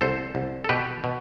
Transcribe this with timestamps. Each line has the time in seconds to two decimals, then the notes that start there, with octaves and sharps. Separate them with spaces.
0.01 C2 A4 C5
0.35 C2
0.64 A4
0.69 B2 G4 B4
1.04 B2